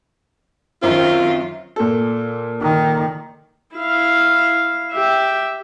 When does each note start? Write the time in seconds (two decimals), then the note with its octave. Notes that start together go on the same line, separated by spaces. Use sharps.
0.82 F#2 D#3 F#3 C4 F4 C5
1.76 A#2 A4
2.61 D#3
3.76 E4 F5
4.92 G4 E5